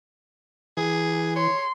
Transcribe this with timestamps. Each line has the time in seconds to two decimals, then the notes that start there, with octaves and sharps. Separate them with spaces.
0.77 E3 G#4
1.36 C#5 C6